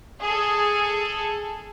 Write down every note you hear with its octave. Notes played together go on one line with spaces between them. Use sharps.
G#4 A4